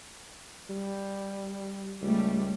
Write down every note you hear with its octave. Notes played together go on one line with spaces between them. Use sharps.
G3
C#2 G3 A3